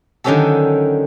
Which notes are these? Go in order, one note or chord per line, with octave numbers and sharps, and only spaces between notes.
D3 D#3 F#3 C#4 G4 A4